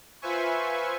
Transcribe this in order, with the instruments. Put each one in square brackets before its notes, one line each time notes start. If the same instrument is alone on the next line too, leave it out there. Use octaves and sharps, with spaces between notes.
[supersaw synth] F4 B4 C5 E5 G#5 C#6